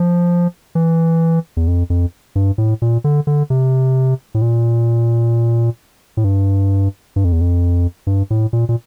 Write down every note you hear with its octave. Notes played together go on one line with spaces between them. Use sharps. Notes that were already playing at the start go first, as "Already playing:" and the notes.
Already playing: F3
E3
E2
F2
F2
G2
A2
A#2
D3
D3
C3
A2
A#2
A2
G2
G2
F2
E2
F2
G2
A2
A#2
A#2